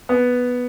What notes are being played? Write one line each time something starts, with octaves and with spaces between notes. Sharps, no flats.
B3